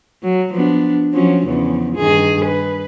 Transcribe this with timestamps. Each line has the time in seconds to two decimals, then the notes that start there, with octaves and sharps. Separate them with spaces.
0.23 F#3
0.54 F3 B3 D4
1.14 F3 F#3 C#4
1.46 E2 C#3 F3
1.95 G2 D#3 G#4
2.45 B4